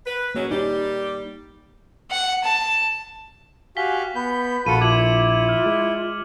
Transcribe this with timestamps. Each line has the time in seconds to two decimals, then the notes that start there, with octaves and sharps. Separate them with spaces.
0.06 B4
0.35 F#3 G#3 A#3 C#4
0.51 G3 D#4 G4
2.10 F#5
2.44 A5
3.77 F#4 G4 F5 G#5 B6 G7
4.15 B3 B5 G6
4.66 A#1 F4 F#4 A4 C#7 D#7
4.81 E4 F4 D6 G#6 F#7
5.49 F6
5.66 G#3